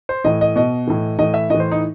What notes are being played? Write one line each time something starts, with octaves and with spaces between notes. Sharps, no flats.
C5
A2 E3 D#5
D#5
B2 D#5
A2 E3
A2 E3 D#5
E5
A2 E3 D#5
C5
D#4